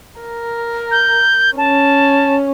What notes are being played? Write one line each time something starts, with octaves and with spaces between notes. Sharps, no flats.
A#4
G6
C#4 A5